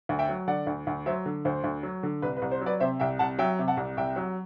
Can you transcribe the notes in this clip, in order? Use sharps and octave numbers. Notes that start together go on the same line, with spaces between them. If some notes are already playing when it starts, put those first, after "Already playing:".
D2
E5 G5
F#3
D3 D5 F#5
D2
D2
F#3 C5 E5
D3
D2 C5
D2
F#3
D3
C2 B4
B4
C2
C5
F#3
B4 D5
C3 C5 E5
C2 E5 G5
C2 F#5 A5
F#3 E5 G5
C3
F#5 A5
C2
C2 E5 G5
F#3